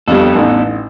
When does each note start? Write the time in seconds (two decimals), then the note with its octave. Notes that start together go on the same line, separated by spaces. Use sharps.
0.08 F2 G3 B3 D4 A4
0.35 A1 D#4